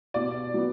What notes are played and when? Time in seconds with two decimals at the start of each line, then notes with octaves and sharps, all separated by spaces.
0.14 B2 D5
0.54 F#3 B3